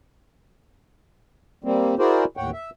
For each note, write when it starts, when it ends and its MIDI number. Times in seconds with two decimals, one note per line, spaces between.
1.64 1.95 55
1.64 1.95 58
1.64 1.95 60
1.99 2.25 64
1.99 2.25 66
1.99 2.25 68
1.99 2.25 70
1.99 2.25 72
1.99 2.25 74
2.37 2.50 39
2.37 2.50 45
2.37 2.50 73
2.37 2.50 78
2.37 2.50 79
2.53 2.70 76